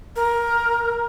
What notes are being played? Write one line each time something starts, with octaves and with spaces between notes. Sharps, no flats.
A#4